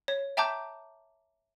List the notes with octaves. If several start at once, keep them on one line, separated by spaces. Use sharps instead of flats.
C#5
E5 G5 A5 A#5 D6 G6